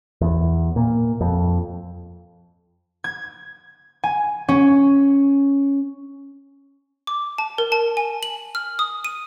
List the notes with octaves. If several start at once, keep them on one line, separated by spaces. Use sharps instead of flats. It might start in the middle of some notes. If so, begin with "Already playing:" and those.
E2
A#2
F2
G#6
G#5
C#4
D6
A5
A#4
A5
G#5
F#7
F6
D#6
D#7